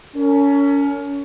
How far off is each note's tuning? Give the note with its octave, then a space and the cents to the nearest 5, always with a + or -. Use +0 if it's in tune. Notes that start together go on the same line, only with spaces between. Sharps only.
C#4 +25 A#4 -35